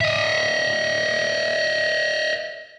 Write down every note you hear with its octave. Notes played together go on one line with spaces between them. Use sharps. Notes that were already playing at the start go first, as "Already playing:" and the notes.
D#5 E5